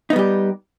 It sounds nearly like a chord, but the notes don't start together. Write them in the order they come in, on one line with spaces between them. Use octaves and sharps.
D#4 B3 G3 G4